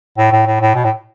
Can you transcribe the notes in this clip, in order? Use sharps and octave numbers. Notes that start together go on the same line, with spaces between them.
A2
A2
A2
A2
B2
A2